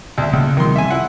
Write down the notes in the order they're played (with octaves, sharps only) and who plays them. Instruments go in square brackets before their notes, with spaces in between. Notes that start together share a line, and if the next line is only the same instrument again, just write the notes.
[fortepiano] D2 E5
[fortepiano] C#2 [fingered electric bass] C#3 A#3
[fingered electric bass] C3 F3 G3 [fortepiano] D#3 C6
[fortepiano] E5 G#5
E4 F#5